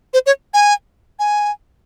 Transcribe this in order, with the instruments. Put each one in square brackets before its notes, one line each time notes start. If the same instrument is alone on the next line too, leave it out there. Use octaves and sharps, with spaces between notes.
[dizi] C5
C#5
G#5
G#5